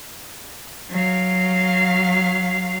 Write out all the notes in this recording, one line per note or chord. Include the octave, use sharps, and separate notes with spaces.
F#3 F5